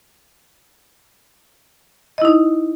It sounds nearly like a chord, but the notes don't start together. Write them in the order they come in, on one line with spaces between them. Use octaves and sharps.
D#5 E4 D#4